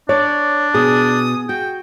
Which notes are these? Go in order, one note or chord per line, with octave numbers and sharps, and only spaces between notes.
D4 C#5 D5
B2 G#4 D#6
F#4 G5